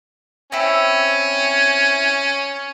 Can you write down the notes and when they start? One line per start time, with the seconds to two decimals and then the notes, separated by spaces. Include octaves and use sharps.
0.52 C4 C#4 E4